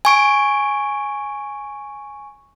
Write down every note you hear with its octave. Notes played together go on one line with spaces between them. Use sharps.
G#5 C#6 D7